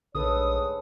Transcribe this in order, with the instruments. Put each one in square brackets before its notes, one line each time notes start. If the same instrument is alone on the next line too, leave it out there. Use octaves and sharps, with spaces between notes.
[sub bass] A#1 [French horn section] G#2 G#3 C#5 [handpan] D3 A4 B4 [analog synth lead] D#6